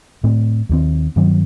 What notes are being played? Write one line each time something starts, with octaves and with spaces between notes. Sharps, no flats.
A2 A3 C4
D#2 D#3 F#3 C4
G2 D#3 F#3 C4